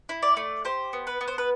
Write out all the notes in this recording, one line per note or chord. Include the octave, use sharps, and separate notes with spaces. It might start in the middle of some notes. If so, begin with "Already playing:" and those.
E4
D5
A3
G4 C5
B3
B4
B3
C5
B4